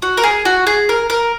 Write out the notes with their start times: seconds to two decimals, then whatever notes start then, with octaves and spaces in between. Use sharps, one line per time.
0.02 F#4
0.17 A#4
0.23 G#4
0.45 F#4
0.67 G#4
0.89 A#4
1.10 A#4